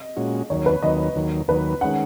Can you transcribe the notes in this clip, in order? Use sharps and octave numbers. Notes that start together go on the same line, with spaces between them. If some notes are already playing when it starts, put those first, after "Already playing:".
Already playing: D#5
A#2 G#3 C#4 F#4
D#2 D#3 F#3 C#5
B4
D#2 D#3 F#3 D#5
D#2 D#3 F#3
D#2 D#3 F#3 B4
D#3 G#3 C#4 F#5